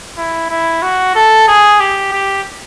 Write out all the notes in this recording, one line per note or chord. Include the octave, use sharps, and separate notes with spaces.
E4
E4
F#4
A4
G#4
G4
G4